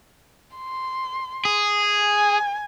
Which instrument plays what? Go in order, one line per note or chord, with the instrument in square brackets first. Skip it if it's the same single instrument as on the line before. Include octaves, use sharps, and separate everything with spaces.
[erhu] C6
[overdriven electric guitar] G#4
[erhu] G#5